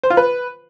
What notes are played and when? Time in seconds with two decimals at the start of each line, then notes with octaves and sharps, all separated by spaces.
0.03 C5
0.10 F4
0.17 B4